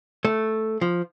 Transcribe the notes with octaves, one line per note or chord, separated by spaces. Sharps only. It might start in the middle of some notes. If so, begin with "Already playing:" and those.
A3
F3